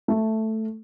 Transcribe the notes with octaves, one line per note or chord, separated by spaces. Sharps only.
A3